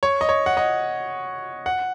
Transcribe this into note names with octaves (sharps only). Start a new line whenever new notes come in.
C#5
D#5
C#5
F#5
D#5
F#5